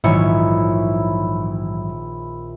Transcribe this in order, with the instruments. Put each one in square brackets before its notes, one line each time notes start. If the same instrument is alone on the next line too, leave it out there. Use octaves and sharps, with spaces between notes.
[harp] A#1 D#3 C#5 [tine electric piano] G#2 E3 F#3 [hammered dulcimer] E4